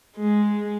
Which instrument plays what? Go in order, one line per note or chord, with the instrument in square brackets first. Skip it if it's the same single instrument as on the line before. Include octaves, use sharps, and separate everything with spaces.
[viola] G#3